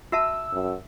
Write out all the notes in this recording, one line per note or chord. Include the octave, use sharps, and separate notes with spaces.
F#4 E5 A5 E6
F#2